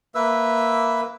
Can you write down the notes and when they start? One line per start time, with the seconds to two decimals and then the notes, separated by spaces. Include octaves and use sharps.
0.15 A#3 B4 E5 E6